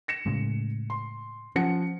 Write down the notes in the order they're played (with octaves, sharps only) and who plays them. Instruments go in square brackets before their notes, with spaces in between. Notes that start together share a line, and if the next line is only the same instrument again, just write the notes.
[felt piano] A#6 C#7 E7
[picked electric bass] A2 C#3 G#3
[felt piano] C6
[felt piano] F3 F#5 C#7 [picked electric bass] C#4